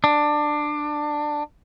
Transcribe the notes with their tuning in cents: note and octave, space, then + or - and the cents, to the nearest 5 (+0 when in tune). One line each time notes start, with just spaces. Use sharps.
D4 +15